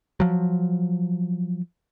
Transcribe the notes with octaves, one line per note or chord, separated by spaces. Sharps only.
F3 F#3